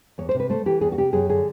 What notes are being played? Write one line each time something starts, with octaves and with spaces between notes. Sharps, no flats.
E2 C#5
C5
C3
B4
A3 C5
E3 G4
E2 G#4
F#4
C3 G4
F#2 G#4
D3 G#4